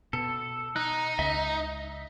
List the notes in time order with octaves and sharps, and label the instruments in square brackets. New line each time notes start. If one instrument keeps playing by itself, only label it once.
[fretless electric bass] B2 [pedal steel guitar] A4
[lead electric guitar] D#4 [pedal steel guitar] F#6
[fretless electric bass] C#2 [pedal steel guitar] D#5 E5